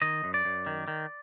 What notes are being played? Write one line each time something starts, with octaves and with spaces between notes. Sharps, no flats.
D#3 D#5
F#2
D5
F#2
D#3
D#3